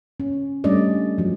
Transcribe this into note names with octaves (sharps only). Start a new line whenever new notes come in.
C#4
G3 A3 C#4 D4 D5 D#5
F3 F#3